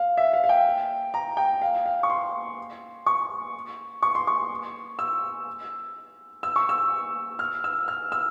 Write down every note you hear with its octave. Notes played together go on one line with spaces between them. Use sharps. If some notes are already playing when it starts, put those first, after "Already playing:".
Already playing: F5
E5
F5
F5
G5
A#5
G5
F5
F5
C#6
C6
C#6
C#6
C6
C#6
E6
E6
C#6
E6
F6
E6
F6
E6